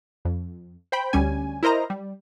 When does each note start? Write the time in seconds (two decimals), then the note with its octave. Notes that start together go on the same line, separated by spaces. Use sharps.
0.25 F2
0.92 C5 G5 B5
1.13 D2 G3 C#4 G#5
1.63 E4 A#4 C5 D#5 A#5
1.90 G3